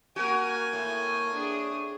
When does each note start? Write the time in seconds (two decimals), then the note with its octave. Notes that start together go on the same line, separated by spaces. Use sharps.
0.16 A#3 F#4 A#4 G#5
0.73 A2
1.34 D4 G#4